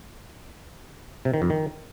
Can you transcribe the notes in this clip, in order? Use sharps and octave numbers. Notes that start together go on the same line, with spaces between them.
C3
D#3
F2
D#3